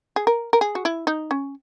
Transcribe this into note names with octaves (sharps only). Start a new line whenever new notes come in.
G#4
A#4
A#4
G#4
F#4
E4
D#4
C#4